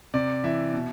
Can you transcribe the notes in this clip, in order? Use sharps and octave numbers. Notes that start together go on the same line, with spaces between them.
C3 D5
E3 E5
B2